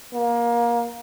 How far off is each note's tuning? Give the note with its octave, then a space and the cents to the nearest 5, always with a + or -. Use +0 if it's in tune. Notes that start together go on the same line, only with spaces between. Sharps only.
A#3 +20